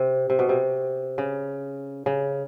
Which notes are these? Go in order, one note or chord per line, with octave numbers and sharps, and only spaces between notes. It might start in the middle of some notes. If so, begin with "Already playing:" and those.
Already playing: C3
C3
B2
C3
C#3
C#3